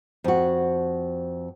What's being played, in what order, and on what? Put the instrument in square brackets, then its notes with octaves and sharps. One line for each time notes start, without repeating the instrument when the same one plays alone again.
[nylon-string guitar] F2 F#4